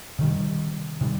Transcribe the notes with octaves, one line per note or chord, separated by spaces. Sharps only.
C3 D#3 G3
C3 D#3 G3